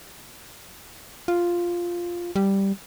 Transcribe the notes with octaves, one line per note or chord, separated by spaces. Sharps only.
F4
G3